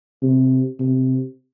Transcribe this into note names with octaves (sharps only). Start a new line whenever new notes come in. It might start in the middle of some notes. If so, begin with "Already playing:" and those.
C3
C3